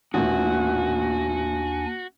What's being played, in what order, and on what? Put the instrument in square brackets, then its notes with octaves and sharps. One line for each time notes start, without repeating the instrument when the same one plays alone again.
[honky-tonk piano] A1 A#2 D#3 [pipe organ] D#2 D4 G#5 [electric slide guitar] F#4